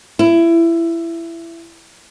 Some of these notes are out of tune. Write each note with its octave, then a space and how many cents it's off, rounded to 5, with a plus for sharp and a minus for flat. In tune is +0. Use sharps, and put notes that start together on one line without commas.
E4 +20